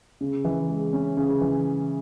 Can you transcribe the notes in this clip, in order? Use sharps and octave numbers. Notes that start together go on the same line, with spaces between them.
C#3
E3
G#3
C#4
C#3
E3